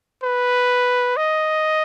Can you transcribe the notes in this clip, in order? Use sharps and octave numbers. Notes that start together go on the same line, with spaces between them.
B4
D#5